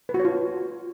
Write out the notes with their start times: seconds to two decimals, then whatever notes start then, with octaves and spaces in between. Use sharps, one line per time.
0.09 B4
0.14 F#4
0.20 C#5
0.25 F4